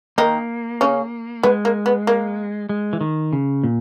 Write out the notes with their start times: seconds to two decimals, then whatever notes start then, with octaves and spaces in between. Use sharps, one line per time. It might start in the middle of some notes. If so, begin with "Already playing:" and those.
0.18 D#3 A#3 D#4
0.81 C#3 C#4
1.43 G#3 B3
1.65 A#3
1.86 B3
2.07 A#3
2.69 G#3
2.93 E3
3.01 D#3
3.33 C#3
3.64 A#2